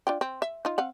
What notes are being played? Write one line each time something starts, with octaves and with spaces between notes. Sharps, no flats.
D4 F4 G5
C4
E5
D#4 F4
C4 F5 F#5